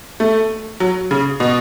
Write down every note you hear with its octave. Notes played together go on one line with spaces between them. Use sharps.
A3
F#3
C#3
B2